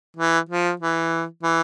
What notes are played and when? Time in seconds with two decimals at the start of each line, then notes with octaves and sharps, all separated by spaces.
0.17 E3
0.49 F3
0.80 E3
1.43 E3